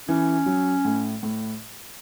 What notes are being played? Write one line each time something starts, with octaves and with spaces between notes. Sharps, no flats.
E3 C#4
F#3
A2
A2